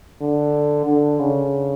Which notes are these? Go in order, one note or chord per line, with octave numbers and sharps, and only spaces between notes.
D3
D3
C#3